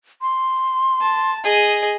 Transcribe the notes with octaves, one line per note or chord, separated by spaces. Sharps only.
C6
A5
G#4 D#5